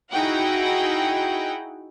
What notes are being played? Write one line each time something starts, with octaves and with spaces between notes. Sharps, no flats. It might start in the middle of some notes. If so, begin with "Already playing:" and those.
D#4 E4 F#4 G#4 F#5 G5